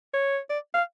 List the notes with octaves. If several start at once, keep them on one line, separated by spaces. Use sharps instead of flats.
C#5
D5
F5